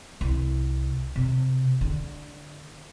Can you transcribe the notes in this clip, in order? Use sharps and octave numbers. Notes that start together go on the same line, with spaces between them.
C2
C3
D3